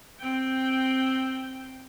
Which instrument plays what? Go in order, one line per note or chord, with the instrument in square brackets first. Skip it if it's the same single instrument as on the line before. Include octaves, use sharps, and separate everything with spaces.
[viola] C4 G5